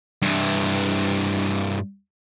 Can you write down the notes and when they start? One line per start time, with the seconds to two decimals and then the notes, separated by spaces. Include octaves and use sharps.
0.22 G2 E3